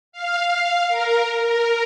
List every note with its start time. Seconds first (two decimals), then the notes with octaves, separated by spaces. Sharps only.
0.12 F5
0.88 A#4
1.43 A#4